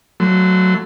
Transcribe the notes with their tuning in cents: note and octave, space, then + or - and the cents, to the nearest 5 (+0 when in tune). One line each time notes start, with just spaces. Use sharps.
F#3 +0 A3 +0 C6 -30